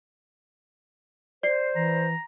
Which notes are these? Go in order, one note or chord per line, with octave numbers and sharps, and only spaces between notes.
C5 D5 C7
E3 A#5